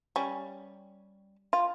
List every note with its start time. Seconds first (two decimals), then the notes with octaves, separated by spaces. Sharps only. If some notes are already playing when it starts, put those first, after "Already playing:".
0.16 G3 C#4
1.53 F4